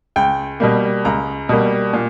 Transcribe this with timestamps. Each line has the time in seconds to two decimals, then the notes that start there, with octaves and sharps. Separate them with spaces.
0.16 C#2 G5
0.60 B2 G3 A#3
1.05 C#2 A#5
1.49 B2 G3 A#3
1.93 A#2